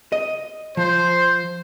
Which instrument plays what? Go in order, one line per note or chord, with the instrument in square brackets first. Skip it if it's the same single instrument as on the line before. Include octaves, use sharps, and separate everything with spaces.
[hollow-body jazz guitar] D#5
[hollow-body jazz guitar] F3 [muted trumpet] C5